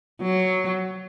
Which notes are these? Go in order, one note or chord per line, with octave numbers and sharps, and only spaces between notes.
F#3